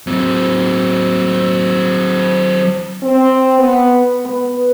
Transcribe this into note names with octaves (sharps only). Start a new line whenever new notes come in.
F#3 C4
C4
B3
B3